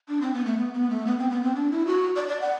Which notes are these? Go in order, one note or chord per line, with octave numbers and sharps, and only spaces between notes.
D4
C4
B3
A3
B3
B3
A3
B3
C4
B3
C4
D4
E4
F#4
D5
D5
F#5